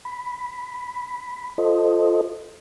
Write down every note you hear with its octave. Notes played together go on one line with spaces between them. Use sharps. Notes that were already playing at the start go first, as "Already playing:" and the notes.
B5
F4 A4 C5 D#5